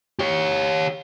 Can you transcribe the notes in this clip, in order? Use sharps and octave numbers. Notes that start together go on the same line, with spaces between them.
G4 C#5